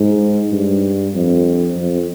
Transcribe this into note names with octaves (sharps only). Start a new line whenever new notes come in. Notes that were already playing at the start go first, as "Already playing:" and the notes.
Already playing: G#2
G2
F2
F2